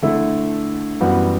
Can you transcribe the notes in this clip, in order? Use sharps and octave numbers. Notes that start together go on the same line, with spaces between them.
D3 A3 E4 A4
F#2 E3 G3 B3 F#4